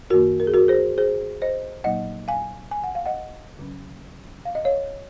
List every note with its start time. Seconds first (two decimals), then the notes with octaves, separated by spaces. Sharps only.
0.10 F#2 D#3 A#3 F#4 A#4
0.40 A#4
0.47 G#4
0.54 F#4 A#4
0.68 G#4 C5
0.98 G#4 C5
1.42 C5 D#5
1.84 A#2 F#3 A#3 D#4 D#5 F#5
2.28 F5 G#5
2.71 G#5
2.84 F#5
2.95 F5
3.06 D#5 F#5
3.59 C#3 F#3 C#4
4.45 F5
4.55 D#5
4.65 C#5 F5